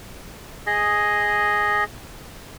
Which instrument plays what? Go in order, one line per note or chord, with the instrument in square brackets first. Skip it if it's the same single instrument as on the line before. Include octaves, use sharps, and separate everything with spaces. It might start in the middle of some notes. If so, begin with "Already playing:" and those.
[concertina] G#4 D#5